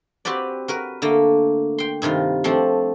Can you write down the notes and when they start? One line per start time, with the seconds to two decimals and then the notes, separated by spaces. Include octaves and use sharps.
0.25 C4 F#4 G4 B4 D5
0.68 F#4 A#4 B4
1.02 D3 A3 A#3
1.78 G5 C6
2.02 G2 C3 D#3 F4
2.44 F3 A3 C4 D4